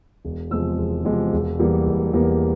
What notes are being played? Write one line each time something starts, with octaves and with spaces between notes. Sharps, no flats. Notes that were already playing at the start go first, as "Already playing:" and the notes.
E1
E2 C3 F3 G#3 E6
E1
E2 C3 F3 G#3
E1
E2 E3 G3 A#3
E1
E2 E3 G3 A#3